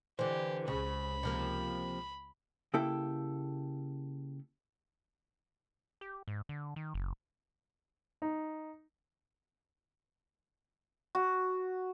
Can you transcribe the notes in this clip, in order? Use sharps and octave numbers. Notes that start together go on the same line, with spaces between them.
D3 E3 G4 C5
C#2 C#3 B5
C3 F3 A#3
C#3 A#3 E4 G4 A4
G4
G#2
D3
D#3
F#1
D#4
F#4